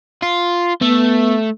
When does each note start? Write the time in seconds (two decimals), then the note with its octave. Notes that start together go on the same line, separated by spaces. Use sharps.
0.22 F4
0.81 A3 B3